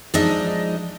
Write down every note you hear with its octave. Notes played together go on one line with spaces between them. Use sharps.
F3 G#3 D4 D#4 D#5 E5